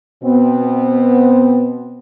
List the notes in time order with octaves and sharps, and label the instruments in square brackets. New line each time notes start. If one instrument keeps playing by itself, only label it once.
[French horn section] B2 B3 C4